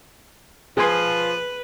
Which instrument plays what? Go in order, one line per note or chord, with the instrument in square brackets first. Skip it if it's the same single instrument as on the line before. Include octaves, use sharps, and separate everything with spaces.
[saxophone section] F3 [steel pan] G#4 G#5 C6 [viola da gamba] B4